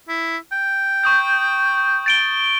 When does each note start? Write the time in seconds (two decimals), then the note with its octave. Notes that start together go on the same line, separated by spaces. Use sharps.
0.09 E4
0.52 G5
1.04 C#6 D#6 G6
2.06 A6 D7 G7